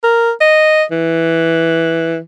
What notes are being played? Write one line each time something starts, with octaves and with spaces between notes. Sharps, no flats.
A#4
D#5
E3